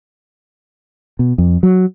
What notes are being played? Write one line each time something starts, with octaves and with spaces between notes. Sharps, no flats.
B2
F2
F#3